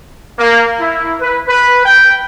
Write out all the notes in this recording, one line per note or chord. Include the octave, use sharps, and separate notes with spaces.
A#3
E4
B4
B4
G5